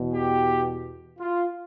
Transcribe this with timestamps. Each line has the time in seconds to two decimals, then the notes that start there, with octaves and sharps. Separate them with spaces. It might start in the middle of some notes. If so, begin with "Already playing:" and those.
Already playing: E2 B2
0.14 G4
1.20 F4